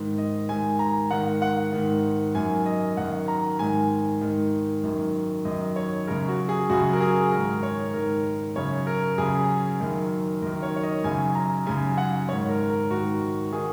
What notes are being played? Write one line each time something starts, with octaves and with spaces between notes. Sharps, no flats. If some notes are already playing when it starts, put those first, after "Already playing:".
Already playing: G#2 D#3
D#5
G#2 D#3 G#5
A#5
G#2 D#3 F#5
F#5
G#2 D#3
F#2 D#3 G#5
D#5
F#2 D#3 F#5
A#5
G#2 D#3 G#5
G#2 D#3
F#2 D#3
F#2 D#3 D#5
C#5
F#2 C#3 A#4
F#4
G#4
F#2 C#3 F#4
A#4
G#4
G#2 D#3 A#4
C#5
G#2 D#3 A#4
F#2 C#3 C#5
A#4
F#2 C#3 G#4
F#2 D#3
F#2 D#3 A#4
C#5
C#5
D#5
F#2 C#3 G#5
A#5
F#2 C#3 G#5
F#5
G#2 D#3 C#5
A#4
A#4
G#2 D#3 F#4
D#3 G#4